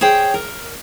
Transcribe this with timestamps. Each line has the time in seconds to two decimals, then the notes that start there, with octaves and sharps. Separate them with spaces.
0.01 G#4 C5 C#5 G5
0.34 A#4